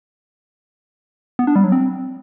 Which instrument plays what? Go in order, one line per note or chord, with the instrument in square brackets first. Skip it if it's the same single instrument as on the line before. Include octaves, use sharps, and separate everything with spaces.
[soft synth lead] B3
D4
G3
F#3
C4